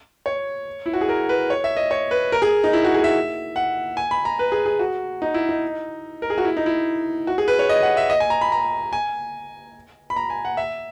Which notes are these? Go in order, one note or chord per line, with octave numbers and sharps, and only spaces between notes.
C#5
E4
F#4
G#4
A#4
B4
C#5
E5
D#5
C#5
B4
A#4
G#4
D#4
E4
F#4
G#4
E5
F#5
G#5
B5
A#5
B4
G#4
G#4
F#4
D#4
E4
D#4
A#4
G#4
F#4
E4
D#4
E4
F#4
G#4
B4
C#5
D#5
F#5
E5
D#5
G#5
A#5
B5
A#5
G#5
B5
A#5
G#5
F#5
E5